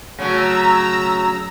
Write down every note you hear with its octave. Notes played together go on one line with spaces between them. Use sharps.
C#3 F#3 A3 C#4 F#4 A#5 E6